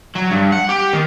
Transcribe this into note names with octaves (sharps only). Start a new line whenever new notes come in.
F#3
G2
F#5
G4
D#3